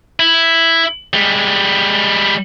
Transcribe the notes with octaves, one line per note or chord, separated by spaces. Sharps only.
E4
G3 G#3